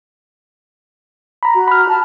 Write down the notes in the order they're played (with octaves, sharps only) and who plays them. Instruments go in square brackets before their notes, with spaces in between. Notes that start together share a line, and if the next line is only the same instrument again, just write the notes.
[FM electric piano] A#5 B5
[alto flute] F#4
[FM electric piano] B5 F6
[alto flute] A5